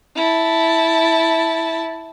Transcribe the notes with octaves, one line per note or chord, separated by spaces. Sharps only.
E4 A5